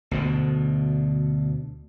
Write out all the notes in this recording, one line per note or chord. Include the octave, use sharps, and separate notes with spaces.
D2 B2 D3